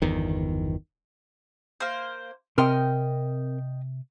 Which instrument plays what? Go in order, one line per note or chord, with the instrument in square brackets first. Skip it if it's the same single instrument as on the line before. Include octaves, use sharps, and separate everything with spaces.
[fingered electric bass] G1 E2 D#3
[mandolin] A#3 C5
[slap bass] C3 [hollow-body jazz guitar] C4 A#4 C6 [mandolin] D#5 G5 F6